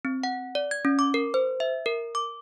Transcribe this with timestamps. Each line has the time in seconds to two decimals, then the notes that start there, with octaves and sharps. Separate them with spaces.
0.05 C4
0.23 F#5
0.55 D5
0.71 G#6
0.85 C#4
0.99 D6
1.14 A#4
1.34 C5
1.60 E5
1.86 A#4
2.15 D6